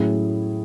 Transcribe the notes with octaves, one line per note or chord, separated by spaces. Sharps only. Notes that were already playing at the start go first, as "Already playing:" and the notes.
Already playing: A2 F#3 C#4 E4 G#4